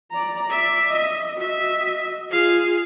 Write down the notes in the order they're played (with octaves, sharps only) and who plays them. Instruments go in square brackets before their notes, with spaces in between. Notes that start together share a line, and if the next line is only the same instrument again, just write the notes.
[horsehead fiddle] D5 A#5
[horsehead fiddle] D5 [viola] E5
[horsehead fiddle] D#5
[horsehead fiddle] F#4 D#5 [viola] E5
[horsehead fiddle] F4 [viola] G#4 F5